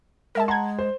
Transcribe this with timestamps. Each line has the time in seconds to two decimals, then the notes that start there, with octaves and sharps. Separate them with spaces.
0.35 G#3 A#4 E5 A5
0.48 F#5 A5 A#5 C6 G#6
0.79 C5